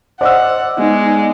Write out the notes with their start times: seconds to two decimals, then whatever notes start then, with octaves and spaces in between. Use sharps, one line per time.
0.21 C5 D5 D#5 F#5 E6
0.78 G#3 B3 D#4